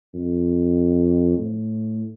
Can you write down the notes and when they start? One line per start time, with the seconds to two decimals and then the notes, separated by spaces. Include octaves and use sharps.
0.14 F2
1.38 A2